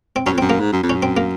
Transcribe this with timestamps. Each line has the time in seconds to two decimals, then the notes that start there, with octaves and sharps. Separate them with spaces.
0.16 C4
0.26 F#2 C#4
0.33 F2
0.38 C4
0.41 F#2
0.50 A#3
0.60 G#2
0.73 F#2
0.84 F2
0.89 C#4
0.95 F#2
1.02 C4
1.17 A#3